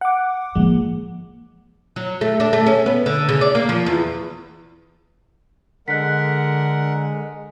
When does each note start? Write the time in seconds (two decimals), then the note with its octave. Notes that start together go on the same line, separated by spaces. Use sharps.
0.01 F#5 D6
0.55 F3 G#3 A#3
1.96 F#3
2.21 A3
2.40 D4
2.53 A3
2.66 C#4
2.86 B3
3.06 D3
3.29 C#3
3.41 D5
3.55 A#3
3.69 F3
3.86 E2
5.88 D3 G#3 A#4 F#5 F#6 B6